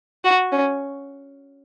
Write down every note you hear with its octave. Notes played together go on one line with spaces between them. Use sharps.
F#4
C#4